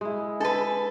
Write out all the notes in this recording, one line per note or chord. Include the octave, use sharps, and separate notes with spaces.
G#3 E4
D4 A4 B4 A5